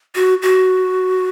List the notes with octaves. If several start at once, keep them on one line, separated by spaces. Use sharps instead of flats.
F#4
F#4